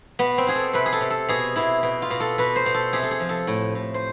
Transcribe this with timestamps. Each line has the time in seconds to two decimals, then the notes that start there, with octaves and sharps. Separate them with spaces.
0.19 B2 B3
0.38 C4
0.47 B2 G#4
0.55 A4
0.73 C3 B4
0.86 G#4
0.93 A4
1.01 C3
1.10 A4
1.29 B2 G#4
1.56 B2 E4
1.83 B2
2.02 F4
2.10 B2
2.20 A4
2.38 B2 B4
2.56 C5
2.66 B2
2.74 A4
2.93 C3 G#4
3.03 A4
3.11 G#4
3.20 F3
3.29 A4
3.47 A2
3.75 A2
3.94 C5